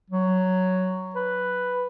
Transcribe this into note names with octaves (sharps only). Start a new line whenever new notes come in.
F#3
B4